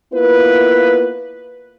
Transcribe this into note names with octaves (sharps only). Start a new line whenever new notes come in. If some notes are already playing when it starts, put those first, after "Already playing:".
A#3 B3 E4 F4 B4